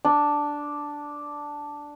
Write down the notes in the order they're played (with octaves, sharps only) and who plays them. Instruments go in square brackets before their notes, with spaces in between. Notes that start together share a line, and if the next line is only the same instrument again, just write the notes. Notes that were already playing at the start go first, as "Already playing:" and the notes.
[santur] D4